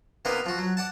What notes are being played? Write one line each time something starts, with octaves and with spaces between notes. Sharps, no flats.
C3 A#3 B3 D#4 A#4
F3 F#4
F#3
D5 F#5 A5